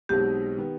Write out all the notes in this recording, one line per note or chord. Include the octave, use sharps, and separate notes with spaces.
B1 B2 G#3 C4 D#4 G4
D#3 B3